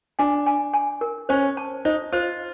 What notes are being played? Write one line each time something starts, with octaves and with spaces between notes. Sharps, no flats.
D4 G#5
G#5
G#5
A#4
C#4 C5
A5
D#4 C5
F4 C5